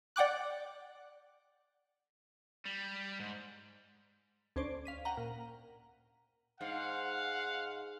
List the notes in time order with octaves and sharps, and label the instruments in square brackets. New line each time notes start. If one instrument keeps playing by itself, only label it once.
[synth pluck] D5 F#5 G5 D6 F#6
[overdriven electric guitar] G3
G#2
[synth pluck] D2 C#4 C5 D5
F5 B6 D#7
F#5 G5 A#5 D#7
A#2
[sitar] G#2 [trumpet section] F5 F#5